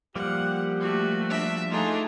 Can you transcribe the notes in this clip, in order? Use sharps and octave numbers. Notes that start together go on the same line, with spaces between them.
F3 G3 A#3 G4 F#5
A3 F#4
D4 E5
A3 D4 D#4 F4 G#4